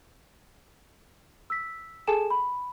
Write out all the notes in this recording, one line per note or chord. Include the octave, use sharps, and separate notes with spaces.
E6 B6
G#4 A4 G#5 A5 E7
B5